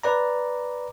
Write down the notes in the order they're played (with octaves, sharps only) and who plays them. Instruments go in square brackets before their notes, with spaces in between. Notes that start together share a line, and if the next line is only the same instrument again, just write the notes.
[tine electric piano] B4 D5 A#5